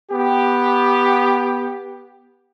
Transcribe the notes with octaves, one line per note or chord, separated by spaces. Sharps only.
B3 G4